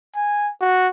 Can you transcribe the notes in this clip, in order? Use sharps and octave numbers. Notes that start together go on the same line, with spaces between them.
G#5
F#4